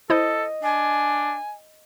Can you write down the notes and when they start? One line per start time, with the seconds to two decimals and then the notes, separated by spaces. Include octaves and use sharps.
0.10 E4 A4 C5 D#5
0.63 D4 G#5